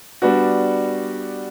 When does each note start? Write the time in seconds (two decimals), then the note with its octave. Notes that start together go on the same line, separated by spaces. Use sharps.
0.22 G3 B3 D4 F#4